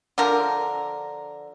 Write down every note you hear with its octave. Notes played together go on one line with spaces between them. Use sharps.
D3 F3 A#4